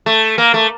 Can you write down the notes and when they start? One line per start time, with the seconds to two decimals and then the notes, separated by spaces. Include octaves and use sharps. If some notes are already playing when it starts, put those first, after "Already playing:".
0.06 A3
0.38 A#3
0.54 A3